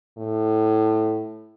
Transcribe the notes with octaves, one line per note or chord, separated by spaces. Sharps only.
A2